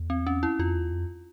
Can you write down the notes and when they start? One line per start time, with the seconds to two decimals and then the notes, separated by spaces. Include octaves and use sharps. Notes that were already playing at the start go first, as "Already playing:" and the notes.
Already playing: E2
0.10 C4
0.27 C#4
0.43 E4
0.59 F2 F4
0.76 E2
0.92 F2